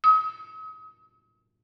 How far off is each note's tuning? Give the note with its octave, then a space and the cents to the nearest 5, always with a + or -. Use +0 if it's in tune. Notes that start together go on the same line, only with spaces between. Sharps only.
D#6 +35